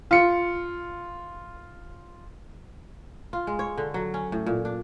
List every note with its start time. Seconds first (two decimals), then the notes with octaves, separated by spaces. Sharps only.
0.11 F4 C#7
3.33 F4
3.47 G#3
3.59 C#5
3.78 D3
3.94 F#3
4.14 C#4
4.32 A2
4.46 A#2
4.65 D4